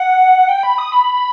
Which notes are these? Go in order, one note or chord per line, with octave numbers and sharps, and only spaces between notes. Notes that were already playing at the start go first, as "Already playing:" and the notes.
Already playing: F#5
G5
B5
D#6
B5